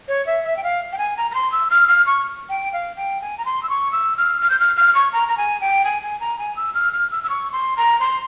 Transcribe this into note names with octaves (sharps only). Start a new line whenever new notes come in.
C#5
E5
E5
G5
F5
G5
G#5
A#5
A#5
C6
E6
F6
F6
C#6
G5
F5
G5
G#5
A#5
C6
E6
C#6
E6
F6
F6
G6
F6
F6
C#6
A#5
A#5
G#5
G5
G#5
G#5
A#5
G#5
E6
F6
F6
E6
E6
C#6
C6
A#5
C6